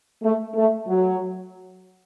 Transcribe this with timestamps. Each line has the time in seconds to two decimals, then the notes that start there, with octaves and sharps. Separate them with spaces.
0.23 A3
0.55 A3
0.87 F#3